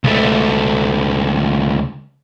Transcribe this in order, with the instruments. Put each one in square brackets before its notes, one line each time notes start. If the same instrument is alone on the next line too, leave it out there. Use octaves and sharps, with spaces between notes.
[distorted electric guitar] C#2 A3